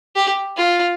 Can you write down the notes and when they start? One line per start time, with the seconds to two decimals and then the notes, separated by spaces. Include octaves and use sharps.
0.16 G4
0.57 F4